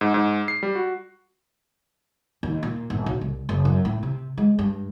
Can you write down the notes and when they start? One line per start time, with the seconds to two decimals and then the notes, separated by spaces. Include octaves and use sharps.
0.01 G#2
0.14 G#2
0.48 C7
0.63 G3
0.75 F#4
2.43 D#2
2.63 A#2
2.90 G1
3.06 B1
3.21 C2
3.49 F#1
3.65 F#2
3.85 A2
4.03 C3
4.38 G#3
4.59 G2